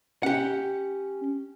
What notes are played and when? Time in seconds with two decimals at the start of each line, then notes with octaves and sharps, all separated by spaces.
0.23 C#4 G4 F#5